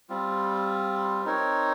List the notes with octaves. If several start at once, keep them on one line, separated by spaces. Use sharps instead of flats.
G3 C4 F4
C4 D#4 A#4 C#5